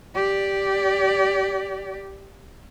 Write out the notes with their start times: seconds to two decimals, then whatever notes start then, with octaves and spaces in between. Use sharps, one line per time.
0.15 G4 D5